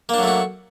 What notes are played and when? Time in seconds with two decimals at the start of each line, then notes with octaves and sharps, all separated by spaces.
0.09 A#3
0.14 D4
0.18 F#3
0.23 A3
0.28 F#4